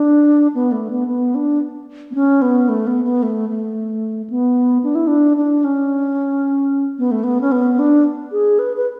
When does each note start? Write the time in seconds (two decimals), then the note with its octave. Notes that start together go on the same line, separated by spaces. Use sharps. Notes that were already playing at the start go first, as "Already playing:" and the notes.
Already playing: D4
0.55 B3
0.72 A3
0.90 B3
1.08 B3
1.35 D4
2.11 B3
2.15 C#4
2.42 B3
2.69 A3
2.87 B3
3.04 B3
3.23 A3
3.50 A3
4.30 B3
4.83 D4
4.95 E4
5.07 D4
5.37 D4
5.64 C#4
6.98 B3
7.11 A3
7.24 B3
7.41 C#4
7.52 B3
7.79 D4
8.32 G#4
8.59 B4
8.77 B4